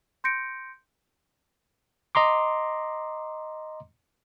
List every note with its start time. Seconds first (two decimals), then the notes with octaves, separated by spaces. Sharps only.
0.24 C6 G6 A#6 C#7 D7
2.15 D#5 A#5 C6 D6